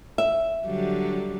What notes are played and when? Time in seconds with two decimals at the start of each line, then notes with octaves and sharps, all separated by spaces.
0.18 E5
0.65 D3 F#3 G3